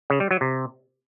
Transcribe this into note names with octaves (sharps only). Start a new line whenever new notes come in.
C#3
G3
F#3
C3